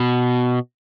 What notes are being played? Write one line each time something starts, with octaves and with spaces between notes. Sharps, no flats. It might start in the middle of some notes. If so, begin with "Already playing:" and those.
Already playing: B2